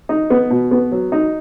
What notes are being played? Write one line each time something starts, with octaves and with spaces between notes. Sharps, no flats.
D#4
B3
B2
B3
F#3
D#4